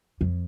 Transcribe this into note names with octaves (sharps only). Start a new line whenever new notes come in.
F2